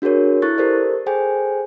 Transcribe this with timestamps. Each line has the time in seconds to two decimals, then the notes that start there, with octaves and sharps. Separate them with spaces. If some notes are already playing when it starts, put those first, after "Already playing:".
0.02 D4 F#4 G#4 A#4 C#5
0.42 E4 A4 C#6 F#6 A6
0.58 G4 A4 A#4 C5 D5
1.06 G#4 A4 C5 G5 G#5